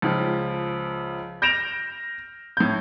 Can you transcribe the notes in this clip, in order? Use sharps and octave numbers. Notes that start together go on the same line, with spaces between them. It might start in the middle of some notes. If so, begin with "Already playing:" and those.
C#2 F3
G6 A#6 D7 E7 F7
A2 G6